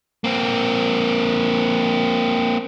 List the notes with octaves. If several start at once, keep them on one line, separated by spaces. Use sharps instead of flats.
A#3 C4